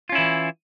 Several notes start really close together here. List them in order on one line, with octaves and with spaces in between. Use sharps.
F4 C#4 E4 E3